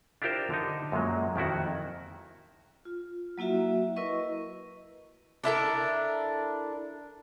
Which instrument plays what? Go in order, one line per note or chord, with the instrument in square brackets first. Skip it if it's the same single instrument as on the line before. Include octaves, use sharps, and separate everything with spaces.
[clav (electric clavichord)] D4 E4 F4 G4 A#4 C5
D3 D#4
F#2 A#2 F#3 G#3
F2 D#3 E4 F#4
[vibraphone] F4
F#3 A#3 E4 F#4 E5
E4 A#4 B4 D#5 C#6
[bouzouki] D4 E4 A4 A#4